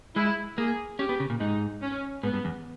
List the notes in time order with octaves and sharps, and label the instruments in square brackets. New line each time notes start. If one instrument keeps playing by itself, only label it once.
[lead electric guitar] G#3 [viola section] E4
[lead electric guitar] A#3 [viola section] G#4
[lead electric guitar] C#4 [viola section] G4
[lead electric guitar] B3
C#3
A#2
[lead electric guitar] G#2 [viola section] D#4
[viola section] C#4
[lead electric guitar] G#2 [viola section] B3
[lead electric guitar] G2
E2